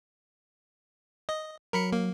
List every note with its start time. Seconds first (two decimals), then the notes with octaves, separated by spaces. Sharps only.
1.29 D#5
1.73 F#3 A#4 B5 C#7
1.92 A#3